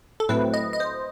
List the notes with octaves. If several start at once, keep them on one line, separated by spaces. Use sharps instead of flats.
A4
A2 F#3 A3 C4 E4 B4
D#5
D#5
C5